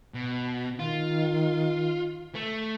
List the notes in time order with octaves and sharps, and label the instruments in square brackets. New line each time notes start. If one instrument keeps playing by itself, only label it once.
[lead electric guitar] B2
[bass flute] D#3 [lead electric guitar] F4
[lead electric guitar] A3